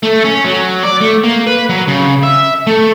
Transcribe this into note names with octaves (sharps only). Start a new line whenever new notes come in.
A3
C#4
F#3
D5
A3
A#3
B4
F#3
C#3
E5
A3